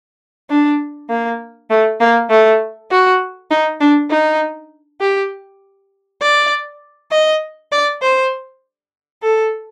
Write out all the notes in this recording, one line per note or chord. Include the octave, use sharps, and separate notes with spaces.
D4
A#3
A3
A#3
A3
F#4
D#4
D4
D#4
G4
D5
D#5
D5
C5
A4